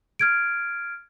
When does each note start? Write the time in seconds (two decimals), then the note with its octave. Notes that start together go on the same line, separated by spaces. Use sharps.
0.19 F6 G#6 D7